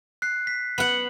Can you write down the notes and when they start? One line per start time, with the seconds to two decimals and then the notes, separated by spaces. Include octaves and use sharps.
0.22 F#6 C7
0.47 B6
0.78 B3 F#5 F#7